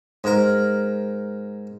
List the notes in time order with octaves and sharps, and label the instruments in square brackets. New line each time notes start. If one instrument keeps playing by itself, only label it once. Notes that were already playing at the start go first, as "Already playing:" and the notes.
[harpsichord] G#2 A#4